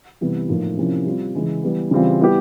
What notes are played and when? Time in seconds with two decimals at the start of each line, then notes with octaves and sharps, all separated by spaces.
0.21 C3 E3 G3 B3 E4
0.48 A2 F3 A#3 D#4
0.77 C3 F3 A#3 C#4 E4
1.06 G3 C4 F4
1.35 C#3 E3 G#3
1.63 E3 G3 B3
1.91 C#3 E3 G3 C4 F4
2.20 G3 B3 E4 G4